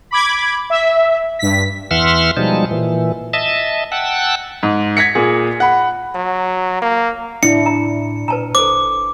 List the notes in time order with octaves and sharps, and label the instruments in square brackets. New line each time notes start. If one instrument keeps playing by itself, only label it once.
[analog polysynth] B5 D6 G#6
E5
G2 B6
[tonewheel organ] E2 E3 E5 F#5 C6 F6
B2 F3 G3 G#3 D#4 A5
A#2 E3
D#5 E5 A5
F#5 G5 A5 E6 F#6
[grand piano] G#2
G#6 A#6 B6 C#7
A#2 G#4
F#5 B5
[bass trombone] F#3
A#3
[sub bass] A2 [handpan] D4 E4 [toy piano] E5 [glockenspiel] C#7
[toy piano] A#5
[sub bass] A#2 [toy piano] B4 A5 A#5
[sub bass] G1 [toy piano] A4 C5 [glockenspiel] D6